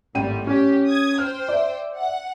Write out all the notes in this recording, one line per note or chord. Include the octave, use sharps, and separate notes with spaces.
G#1 A2 G3 G5 D#7
C#4 G4
D#6 G#6
C5 G5 F6
D5 E5
F#5